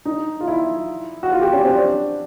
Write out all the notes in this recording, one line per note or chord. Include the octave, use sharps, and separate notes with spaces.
D#4
F4
E4
F#4
F4
G4
C#4
C4
D4